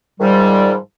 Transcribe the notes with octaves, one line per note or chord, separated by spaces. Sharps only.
G#2 D#3 F3 G3